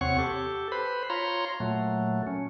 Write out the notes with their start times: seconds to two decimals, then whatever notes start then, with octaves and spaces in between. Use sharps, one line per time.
0.01 E2 C3 C4 C#5 F#5 C#6
0.18 G4 A4
0.72 B4 C5 B5
1.10 F4 C#5 A#5 C6
1.60 A#2 F#3 A3
2.27 C#4